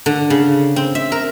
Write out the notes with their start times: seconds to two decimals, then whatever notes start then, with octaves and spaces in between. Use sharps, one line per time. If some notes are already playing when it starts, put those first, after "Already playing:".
0.06 D3
0.30 C#3
0.76 C4
0.95 E5
1.12 A#4